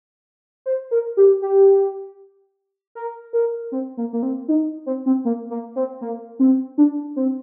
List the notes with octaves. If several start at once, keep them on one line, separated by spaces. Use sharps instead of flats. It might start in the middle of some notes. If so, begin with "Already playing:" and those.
C5
A#4
G4
G4
A#4
A#4
C4
A#3
A#3
C4
D#4
C4
C4
A#3
A#3
C4
A#3
C4
D4
C4